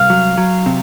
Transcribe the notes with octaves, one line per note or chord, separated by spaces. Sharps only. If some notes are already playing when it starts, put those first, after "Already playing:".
Already playing: C2 F5
F#3
F#3
C3